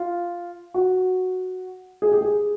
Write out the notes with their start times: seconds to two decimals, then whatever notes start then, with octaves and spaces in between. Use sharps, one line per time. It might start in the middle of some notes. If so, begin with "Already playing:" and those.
Already playing: F4
0.74 F#4
2.02 G#4
2.12 G4
2.21 G#4